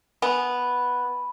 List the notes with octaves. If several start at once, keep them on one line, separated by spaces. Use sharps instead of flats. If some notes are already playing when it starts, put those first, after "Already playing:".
B3 G#5 B5